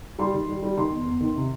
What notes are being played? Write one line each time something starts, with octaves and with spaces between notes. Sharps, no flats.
G3 C6
D#3
G3
G3
D#3 C6
E2
E2
D#3
C3